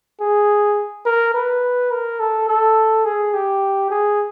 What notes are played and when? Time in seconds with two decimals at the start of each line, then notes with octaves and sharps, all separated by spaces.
0.20 G#4
1.06 A#4
1.34 B4
1.91 A#4
2.20 A4
2.49 A4
3.05 G#4
3.34 G4
3.90 G#4